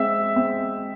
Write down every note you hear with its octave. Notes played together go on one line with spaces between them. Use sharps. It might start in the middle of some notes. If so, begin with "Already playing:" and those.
Already playing: G#3 C4 E5 E6
C4